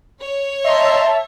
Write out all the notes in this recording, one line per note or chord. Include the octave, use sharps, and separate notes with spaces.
C#5
D#5 E5 G5 A5 A#5 C6